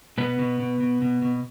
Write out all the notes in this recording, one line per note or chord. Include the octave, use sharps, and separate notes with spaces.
B2 B3
B2
B2
B2
B2
B2